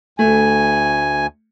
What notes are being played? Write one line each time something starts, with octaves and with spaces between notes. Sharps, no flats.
D2 A3 G#5